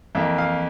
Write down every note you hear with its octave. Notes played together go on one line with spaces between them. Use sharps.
F2 E3 A#3 E5
F5